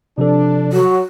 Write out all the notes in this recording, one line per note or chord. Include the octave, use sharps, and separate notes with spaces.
C3 F3 D4 A4
F#3 F#4